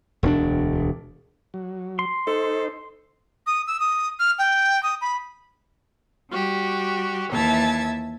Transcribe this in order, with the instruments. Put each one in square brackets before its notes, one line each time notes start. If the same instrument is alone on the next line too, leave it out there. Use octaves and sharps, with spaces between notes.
[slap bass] E1 D2 C#4 D4
[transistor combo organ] F#3
[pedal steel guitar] C6
[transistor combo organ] D#4 C5 [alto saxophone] A4
[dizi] D#6
E6
D#6
F6
G5
D#6
B5
[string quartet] G3 F#4 G4
D#2 E3 E5 A5 G#6